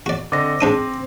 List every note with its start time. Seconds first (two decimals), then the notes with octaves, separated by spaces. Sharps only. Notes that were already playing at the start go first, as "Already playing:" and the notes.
0.06 F#4 D5
0.32 D3 C4 D#5 D6 A#6
0.61 G#2 C4 D4 D#6